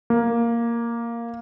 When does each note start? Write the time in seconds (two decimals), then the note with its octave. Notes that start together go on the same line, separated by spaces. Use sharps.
0.10 A#3